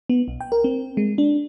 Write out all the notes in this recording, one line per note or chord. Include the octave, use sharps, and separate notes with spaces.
B3
B1
G5
A#4
C4
G#3
D4